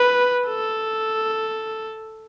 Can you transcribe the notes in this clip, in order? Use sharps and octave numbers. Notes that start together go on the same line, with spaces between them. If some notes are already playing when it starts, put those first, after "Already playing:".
Already playing: B4
A4